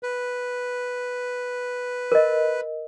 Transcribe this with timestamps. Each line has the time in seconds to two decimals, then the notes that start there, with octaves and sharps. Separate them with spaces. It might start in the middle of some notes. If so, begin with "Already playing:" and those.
0.03 B4
2.12 A#4 D#5